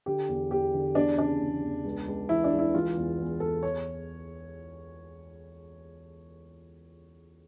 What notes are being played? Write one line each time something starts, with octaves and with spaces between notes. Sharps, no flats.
D3 G4
E2
E2 G4
D3
E2 D4
C#3 D4
E2
E2
C#2
C#2
E3 E4
D4
C#2
E4
E3 F4
E2
E2
E2 A4
C#5